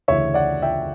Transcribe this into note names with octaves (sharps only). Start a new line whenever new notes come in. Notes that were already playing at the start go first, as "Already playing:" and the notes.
D2 C#3 E3 C#5 E5
D5 F#5
E5 G5